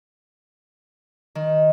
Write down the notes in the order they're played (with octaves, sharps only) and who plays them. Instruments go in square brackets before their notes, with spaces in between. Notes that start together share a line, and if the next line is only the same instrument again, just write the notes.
[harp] D#3